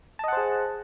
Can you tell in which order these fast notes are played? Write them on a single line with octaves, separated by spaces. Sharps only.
A5 D#5 F#5 C5 G#4